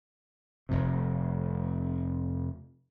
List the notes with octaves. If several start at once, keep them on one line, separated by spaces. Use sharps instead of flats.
F1 F2 C3